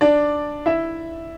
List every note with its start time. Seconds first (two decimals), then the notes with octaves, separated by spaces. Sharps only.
0.01 D4 D5
0.66 E4 E5